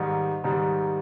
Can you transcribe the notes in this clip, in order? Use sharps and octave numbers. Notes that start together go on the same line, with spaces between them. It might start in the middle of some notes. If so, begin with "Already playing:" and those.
Already playing: G#2 D#3 G3
G#2 D#3 G3